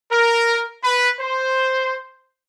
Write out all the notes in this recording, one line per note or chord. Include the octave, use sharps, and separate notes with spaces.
A#4
B4
C5